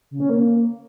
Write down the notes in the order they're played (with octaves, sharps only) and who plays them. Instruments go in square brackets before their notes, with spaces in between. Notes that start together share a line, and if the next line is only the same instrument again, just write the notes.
[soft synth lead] C#3
C#4
A#3